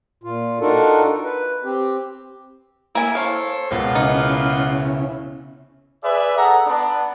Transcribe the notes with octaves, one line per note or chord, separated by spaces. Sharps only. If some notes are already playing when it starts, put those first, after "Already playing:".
A#2 F4
D4 D#4 F4 F#4 A4 A#4
B4
C4 G4
A#3 C#4 E4 G#5
A4 C5 C#5 F5
C#2 B2 A#3 B3 F4
C#3 C#4 D#4 E4
G#4 B4 D5 E5
G#4 A4 F#5 A#5
B3 D4